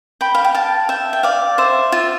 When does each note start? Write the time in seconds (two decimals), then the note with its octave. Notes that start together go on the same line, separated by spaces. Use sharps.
0.21 G5 B5
0.35 F5
0.44 G5
0.54 F5 A5
0.89 E5 G5
1.13 G5
1.23 D5 F5
1.58 C5 E5
1.92 F4